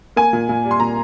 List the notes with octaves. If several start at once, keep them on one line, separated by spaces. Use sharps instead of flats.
A#3 G#5
A#2
A#2
G3
C6
A#2 A#5